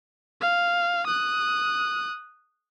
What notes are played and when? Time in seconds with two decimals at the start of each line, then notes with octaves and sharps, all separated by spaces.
0.41 F5
1.07 D#6 F#6